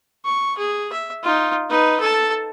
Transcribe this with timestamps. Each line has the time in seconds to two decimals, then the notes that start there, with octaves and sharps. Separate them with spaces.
0.25 C#6
0.57 G#4
0.92 E5
1.23 D#4 F4
1.70 D#4 B4
2.00 A4 A5